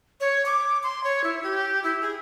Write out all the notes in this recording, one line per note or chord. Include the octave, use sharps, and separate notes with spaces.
C#5
D6
C6
C#5
E4
G4
E4
G#4